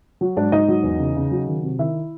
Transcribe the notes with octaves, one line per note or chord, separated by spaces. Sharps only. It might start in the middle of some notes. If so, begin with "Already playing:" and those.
F#3
G#2 D4 D5
G#2 D#4 D#5
F#3
E2
C#3
C#3
F#3
D#3
C3
D#3 E4 E5